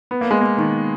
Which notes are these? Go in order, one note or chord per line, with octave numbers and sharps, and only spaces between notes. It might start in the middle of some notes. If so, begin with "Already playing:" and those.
B3
A#3
G#3
A#3
D#3